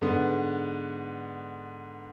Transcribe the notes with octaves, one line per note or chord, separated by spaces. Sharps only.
G#2 D3 B3